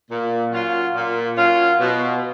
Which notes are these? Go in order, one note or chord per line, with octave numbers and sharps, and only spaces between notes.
A#2
F#3 C#4 F4
A#2
F#3 C#4 F4
B2